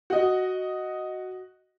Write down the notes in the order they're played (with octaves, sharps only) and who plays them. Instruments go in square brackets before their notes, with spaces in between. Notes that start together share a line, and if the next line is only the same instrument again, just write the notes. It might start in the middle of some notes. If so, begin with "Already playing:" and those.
[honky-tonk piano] F#4 D#5